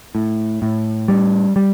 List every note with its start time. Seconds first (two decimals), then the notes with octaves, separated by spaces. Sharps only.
0.15 A2
0.62 A2
1.08 G3
1.56 G3